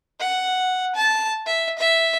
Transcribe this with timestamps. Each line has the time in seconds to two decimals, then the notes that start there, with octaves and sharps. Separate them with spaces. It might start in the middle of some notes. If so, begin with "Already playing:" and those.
0.20 F#5
0.95 A5
1.46 E5
1.78 E5